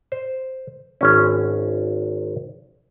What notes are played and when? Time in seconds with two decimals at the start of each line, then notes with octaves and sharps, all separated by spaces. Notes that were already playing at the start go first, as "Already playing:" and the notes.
0.12 C5
1.01 G#1 C#4